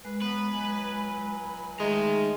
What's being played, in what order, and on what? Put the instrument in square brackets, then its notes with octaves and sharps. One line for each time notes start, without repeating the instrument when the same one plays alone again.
[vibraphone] G#3 [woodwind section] B4
[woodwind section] F#3 B3 [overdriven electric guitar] B4
[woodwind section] C#2 F#3 G#5
[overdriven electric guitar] D#3 A#5 [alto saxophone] G#3 [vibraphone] A3 E5